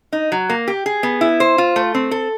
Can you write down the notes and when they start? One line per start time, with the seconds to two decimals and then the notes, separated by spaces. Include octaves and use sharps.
0.13 D#4
0.32 F#3
0.50 A#3
0.68 G4
0.86 G#4
1.03 B3
1.21 E4
1.40 C5
1.58 F4
1.76 A3
1.94 C4
2.11 A4